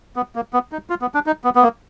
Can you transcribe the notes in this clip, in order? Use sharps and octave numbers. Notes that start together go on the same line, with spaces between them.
B3
A#3
B3
D#4
F4
B3
D4
D#4
B3
B3
A#3